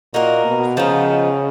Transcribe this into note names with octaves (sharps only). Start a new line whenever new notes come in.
A#2 A#3 D#4 F#4 A#4
B2
C#3 F3 B3 D#4